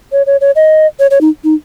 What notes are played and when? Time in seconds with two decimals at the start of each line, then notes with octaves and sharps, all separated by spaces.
0.12 C#5
0.26 C#5
0.41 C#5
0.56 D#5
0.99 C#5
1.11 C#5
1.21 D#4
1.44 D#4